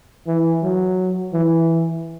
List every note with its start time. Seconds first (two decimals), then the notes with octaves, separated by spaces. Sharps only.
0.27 E3
0.63 F#3
1.34 E3